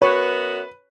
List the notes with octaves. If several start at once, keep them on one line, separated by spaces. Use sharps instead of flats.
F#2 B3 F#4 B4 C#5